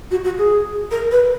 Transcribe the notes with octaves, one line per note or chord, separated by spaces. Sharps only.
F#4
F#4
G#4
A#4
B4